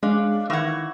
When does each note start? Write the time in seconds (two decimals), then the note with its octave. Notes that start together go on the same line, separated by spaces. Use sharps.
0.03 G#3 C#4 D4 G#4 F5
0.50 D#3 E3 F#5 C#6 E6 F6 G#6